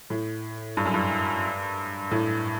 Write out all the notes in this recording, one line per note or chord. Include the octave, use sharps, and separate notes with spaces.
A2
G2
F#2
G2
A2